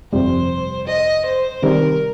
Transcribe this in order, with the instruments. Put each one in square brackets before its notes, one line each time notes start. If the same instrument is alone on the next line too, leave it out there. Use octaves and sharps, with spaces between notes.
[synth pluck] G1 F2 C3 G3 [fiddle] C5
[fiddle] D#5
C5
[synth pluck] C3 D#3 G3 [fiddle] A#4